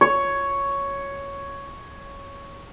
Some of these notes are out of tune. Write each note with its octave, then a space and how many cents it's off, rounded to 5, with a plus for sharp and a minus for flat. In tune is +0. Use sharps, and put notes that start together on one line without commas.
C#5 +5